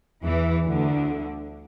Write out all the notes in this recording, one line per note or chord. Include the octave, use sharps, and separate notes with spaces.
E2 E3
D2 D3